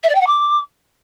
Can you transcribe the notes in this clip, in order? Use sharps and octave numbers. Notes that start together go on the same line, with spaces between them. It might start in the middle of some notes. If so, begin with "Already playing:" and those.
E5
D5
G5
F#5
D6